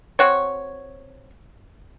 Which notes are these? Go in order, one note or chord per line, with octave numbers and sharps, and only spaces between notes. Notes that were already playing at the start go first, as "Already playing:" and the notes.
C4 F#4 C#5